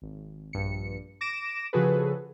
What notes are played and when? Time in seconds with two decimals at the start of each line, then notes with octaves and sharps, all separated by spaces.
0.02 G#1
0.53 A#1 G2 C#7
1.21 D6 A#6 D7 E7
1.73 C#3 F3 F#4 G#4 A4 B4